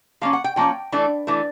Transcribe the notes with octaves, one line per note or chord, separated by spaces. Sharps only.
F3 A#3 C#4 F5
F#5
G5
F3 A#3 C#4 G5
E3 A3 D4
E3 A3 D4